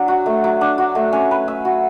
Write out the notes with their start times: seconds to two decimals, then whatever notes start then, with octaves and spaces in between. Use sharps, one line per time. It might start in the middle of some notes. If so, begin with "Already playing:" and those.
Already playing: F#3 D4
0.08 F#4
0.26 A3
0.44 F#3
0.61 D4
0.78 F#4
0.95 A3
1.13 C#4
1.31 B4
1.48 E5
1.65 F#4